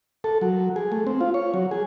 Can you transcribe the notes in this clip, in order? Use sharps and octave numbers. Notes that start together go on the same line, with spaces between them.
A4
F#3
G#4
A3
C4
F4
C#5
F#3
G#4